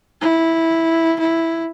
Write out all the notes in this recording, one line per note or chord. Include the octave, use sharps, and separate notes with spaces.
E4
E4